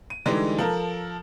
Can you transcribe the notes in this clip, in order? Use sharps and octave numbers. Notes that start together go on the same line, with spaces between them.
D#7
D3 E3 G3 G#3 D#4
F3 A4 A#4